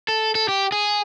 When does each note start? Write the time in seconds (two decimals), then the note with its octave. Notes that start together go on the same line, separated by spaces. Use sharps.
0.08 A4
0.35 A4
0.49 G4
0.72 G#4